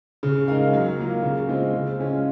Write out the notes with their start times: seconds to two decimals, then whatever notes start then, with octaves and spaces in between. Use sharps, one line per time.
0.23 C#3
0.48 G#3 D#4 A#4 F5
0.73 F#3
0.98 A#3 F4
1.23 C#3
1.49 G#3 C4 F4
1.74 C#3
1.99 G#3 C#4 F4